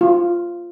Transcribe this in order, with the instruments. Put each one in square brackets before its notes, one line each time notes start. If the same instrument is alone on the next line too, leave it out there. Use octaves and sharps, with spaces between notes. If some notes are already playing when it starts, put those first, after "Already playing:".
[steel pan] F4